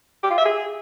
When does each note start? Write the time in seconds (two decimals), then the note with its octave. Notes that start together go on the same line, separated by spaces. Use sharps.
0.23 G4
0.30 F4
0.38 E5
0.45 G#4